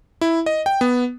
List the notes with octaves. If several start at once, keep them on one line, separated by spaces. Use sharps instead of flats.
E4
D#5
G5
B3